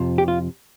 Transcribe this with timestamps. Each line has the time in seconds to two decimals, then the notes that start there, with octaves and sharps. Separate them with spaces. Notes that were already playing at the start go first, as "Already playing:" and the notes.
Already playing: F2 C3 F3
0.18 G4
0.28 F4